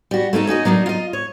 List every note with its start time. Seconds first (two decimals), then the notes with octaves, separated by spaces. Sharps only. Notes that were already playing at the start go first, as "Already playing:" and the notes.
0.11 G3 F#4
0.33 A3 A#3 D#4 A4
0.47 C#4 D#4 F#4 D#5
0.65 F#3 A#3 D4 D#4
0.86 F4 D#5
1.13 C#5